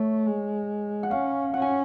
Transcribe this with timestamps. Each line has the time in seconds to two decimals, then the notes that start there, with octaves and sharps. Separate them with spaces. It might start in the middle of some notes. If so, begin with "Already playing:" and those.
Already playing: A3 C#5
0.26 G#3
1.03 F#5
1.10 C#4 F5
1.53 C#4 F#5
1.62 G#5